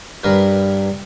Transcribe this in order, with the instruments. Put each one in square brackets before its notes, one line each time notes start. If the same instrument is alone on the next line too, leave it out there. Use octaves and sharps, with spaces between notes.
[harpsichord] G2 A#4 B4